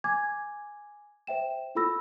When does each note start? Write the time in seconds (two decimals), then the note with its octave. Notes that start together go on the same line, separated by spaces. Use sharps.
0.04 G#5 D6 G#6
1.27 C5 E5 G5 E7
1.75 E4 F4 A4 B5 E6 A#6